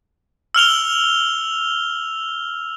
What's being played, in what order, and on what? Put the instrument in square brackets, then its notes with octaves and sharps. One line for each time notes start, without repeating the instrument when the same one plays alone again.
[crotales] E6 F6 F7 G7